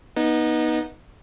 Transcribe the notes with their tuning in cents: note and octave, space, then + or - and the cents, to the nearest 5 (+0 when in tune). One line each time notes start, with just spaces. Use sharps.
B3 -20 D#4 +5